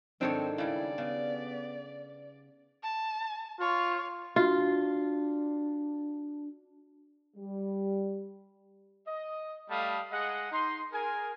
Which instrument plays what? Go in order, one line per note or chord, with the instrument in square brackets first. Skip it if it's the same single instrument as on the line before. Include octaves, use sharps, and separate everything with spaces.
[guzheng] G#2 D#3 C#5 [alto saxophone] C4 [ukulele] D4 A4
[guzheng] C#3 G3 [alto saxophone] E4 [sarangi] D5
[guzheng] C#3 [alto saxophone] B3
[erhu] A5
[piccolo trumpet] F4 [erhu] C#5
[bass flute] D4 [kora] F4 [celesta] F#4
[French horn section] G3
[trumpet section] D#5
G3 A3 F5 A5 B5 D#6
G#3 G#4 D#5 F#5
D#4 C6
G#4 A#4 G#5